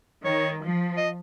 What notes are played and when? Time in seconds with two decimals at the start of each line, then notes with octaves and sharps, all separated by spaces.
0.25 D#3 C#5
0.66 F3
0.97 D#5